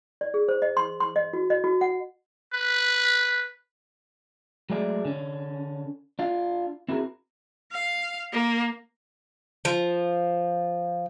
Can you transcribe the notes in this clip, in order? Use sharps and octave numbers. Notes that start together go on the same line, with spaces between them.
D5
G#4
C5
D#5
C6
C6
D#5
F#4
D#5
F#4
F#5
B4
F#3 G#3 A3 G#4 D5
D3 C#4
D4 F4
C4 E4 F#4 G#4 A#4
F5
A#3
F3